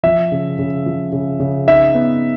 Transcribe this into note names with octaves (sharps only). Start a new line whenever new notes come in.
F3 E5
C#3
C#3
F3
C#3
C#3
D#4 E5
B3